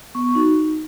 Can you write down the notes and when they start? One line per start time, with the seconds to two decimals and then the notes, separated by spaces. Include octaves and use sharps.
0.15 B3 C#6
0.35 D#4 F#4